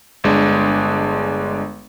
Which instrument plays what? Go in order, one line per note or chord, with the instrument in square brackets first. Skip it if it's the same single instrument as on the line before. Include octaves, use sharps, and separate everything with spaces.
[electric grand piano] G1 G#3 D4